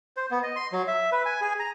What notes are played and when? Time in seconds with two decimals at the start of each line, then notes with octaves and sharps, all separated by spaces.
0.17 C5
0.31 B3
0.43 D#5
0.56 C6
0.73 F#3
0.88 E5
1.12 B4
1.26 G#5
1.41 G#4
1.60 A#5